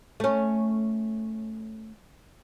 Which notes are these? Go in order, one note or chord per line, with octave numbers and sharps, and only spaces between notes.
A3 C#4